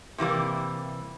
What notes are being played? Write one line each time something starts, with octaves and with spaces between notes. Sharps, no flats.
C3 E3 G3 A#3